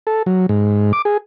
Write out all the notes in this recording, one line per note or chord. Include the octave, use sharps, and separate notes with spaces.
A4
F#3
G#2
D6
G#4